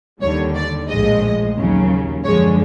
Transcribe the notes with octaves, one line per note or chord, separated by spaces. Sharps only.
D#2 D3 G3 C#5
D5
A#1 A2 F3 G#3 D#5
D#2 C#3 F#3
F#2 D3 F3 G#3 C#5